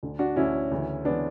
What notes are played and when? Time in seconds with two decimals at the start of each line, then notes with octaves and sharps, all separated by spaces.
0.03 D2 D3
0.19 D4 F#4
0.36 D2 D3 C#4 E4
0.71 D2 C#3 E3
1.05 C#3 E3 B3 D4